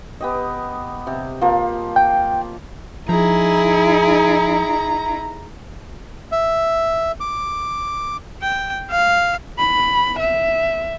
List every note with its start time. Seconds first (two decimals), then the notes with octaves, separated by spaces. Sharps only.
0.21 B3 G4 D#5
1.07 C3
1.41 F3 A#3 F4
1.96 G5
3.09 F3 D#4 E4 G#4 A#5
6.32 E5
7.20 D6
8.42 G5
8.91 F5
9.59 B5
10.20 E5